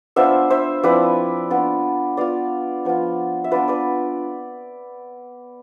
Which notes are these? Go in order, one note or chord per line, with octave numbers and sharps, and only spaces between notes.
B3 D4 F4 C5 E5
C5 E5
F3 C4 E4 B4 D5
B3 D4 F4
B3 F4 D5 F5
F3 B3 F4
E5
B3 D4 F4 B4 D5
B4 D5